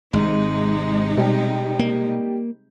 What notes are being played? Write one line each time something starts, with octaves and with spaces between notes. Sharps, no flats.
G#1 G#2 C3 G#3 D#4
B2 G3 G4
A#3